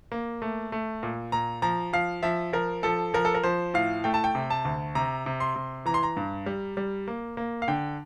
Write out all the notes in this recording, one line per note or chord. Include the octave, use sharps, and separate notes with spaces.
A#3
A3
A3
A#2
A#2 A#5
F3 A#5
F3 F5
F3 E5
F3 A#4
F3 A4
F3 A#4
A4
A#4
F3 C5
A2 F5
A3 G5
A5
G5
C3
A5
D2
C3 A#5
C3
C6
C3
E3 A#5
C6
A#5
G2
G3
G3
A#3
A#3
F5
D3 G5